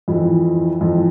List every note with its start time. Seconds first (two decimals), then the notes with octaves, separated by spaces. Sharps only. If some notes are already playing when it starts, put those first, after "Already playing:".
0.08 F2 E3 E4
0.81 F2 E3